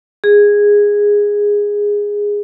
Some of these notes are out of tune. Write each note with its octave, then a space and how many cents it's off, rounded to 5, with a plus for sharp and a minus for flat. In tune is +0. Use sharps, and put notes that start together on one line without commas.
G#4 -10